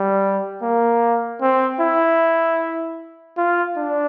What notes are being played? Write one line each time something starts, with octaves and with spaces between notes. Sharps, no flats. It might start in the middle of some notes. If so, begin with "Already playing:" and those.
Already playing: G3
A#3
C4
E4
F4
D4